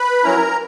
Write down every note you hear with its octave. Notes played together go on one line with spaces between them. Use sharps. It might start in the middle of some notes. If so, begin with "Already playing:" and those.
Already playing: B4 B5
F#3 C#4 E4 A#4 A#5